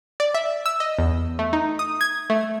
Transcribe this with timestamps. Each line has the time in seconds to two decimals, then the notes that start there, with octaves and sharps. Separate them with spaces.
0.20 D5
0.34 E5
0.66 E6
0.80 D#5
0.99 E2
1.39 A3
1.53 D#4
1.79 D#6
2.01 G#6
2.30 A3